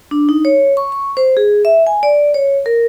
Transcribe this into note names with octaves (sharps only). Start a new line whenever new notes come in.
D4
D#4
C#5
C#6
C#6
C5
G#4
E5
G#5
D5
C#5
A#4